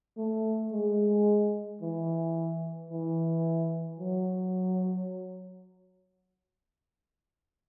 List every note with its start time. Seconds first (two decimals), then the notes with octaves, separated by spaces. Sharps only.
0.17 A3
0.72 G#3
1.82 E3
2.91 E3
3.99 F#3